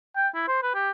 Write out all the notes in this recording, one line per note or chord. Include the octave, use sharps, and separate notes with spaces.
G5
E4
C5
B4
G4